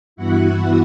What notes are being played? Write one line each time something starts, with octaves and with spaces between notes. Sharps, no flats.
G2 E3 B3 E4 F#4 F#5